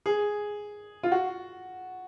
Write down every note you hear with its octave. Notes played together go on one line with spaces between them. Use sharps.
G#4
F4
F#4